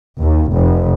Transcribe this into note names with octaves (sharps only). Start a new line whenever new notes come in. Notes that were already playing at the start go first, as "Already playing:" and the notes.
D#2
F1